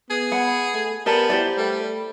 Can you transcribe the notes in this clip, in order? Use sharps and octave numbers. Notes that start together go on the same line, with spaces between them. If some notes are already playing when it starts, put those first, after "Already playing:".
B3 G#4
F#5 B5
A3
B3 G4 A#4 D5 A5
E4 G4 C5 D5
G3 A3